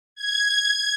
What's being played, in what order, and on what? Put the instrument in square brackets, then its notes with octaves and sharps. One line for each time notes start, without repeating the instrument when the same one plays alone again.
[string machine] G#6